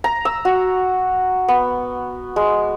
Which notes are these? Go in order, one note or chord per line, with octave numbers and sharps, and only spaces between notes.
A#5
E6
F#4
B3
G#3